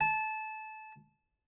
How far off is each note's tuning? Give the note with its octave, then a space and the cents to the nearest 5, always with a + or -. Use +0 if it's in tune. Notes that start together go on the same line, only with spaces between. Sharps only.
A5 -20